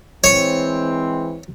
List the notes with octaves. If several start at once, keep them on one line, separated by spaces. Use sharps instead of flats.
E3 G#3 C4 C#5 C#6